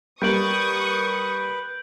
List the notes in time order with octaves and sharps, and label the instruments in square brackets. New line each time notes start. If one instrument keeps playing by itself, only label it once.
[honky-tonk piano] G3 A#3 [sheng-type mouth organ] B4 [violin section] C#6 D#6 [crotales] G6 D7 F#7